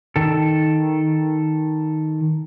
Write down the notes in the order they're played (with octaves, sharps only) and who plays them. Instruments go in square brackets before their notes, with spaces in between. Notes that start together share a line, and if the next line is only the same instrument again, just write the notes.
[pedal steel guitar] D#3 A4